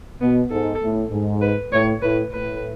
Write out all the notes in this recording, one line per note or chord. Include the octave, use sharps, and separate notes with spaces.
B2 B3
G#2 A4
A2
G#2
B4
A2 C#5
A2 B4
A2 B4